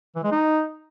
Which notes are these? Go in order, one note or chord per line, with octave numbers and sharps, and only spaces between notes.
E3
G#3
D#4